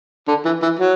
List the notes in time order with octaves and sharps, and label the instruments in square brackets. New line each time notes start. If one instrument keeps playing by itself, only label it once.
[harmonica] D3
E3
E3
F#3